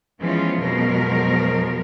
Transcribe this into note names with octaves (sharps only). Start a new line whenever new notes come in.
E3 F3 G#3 B3 C#4 F4
F2 B2 F3 F#3 G#3 A#4